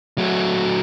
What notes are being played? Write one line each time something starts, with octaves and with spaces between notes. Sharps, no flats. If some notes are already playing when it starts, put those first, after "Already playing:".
F#3 A3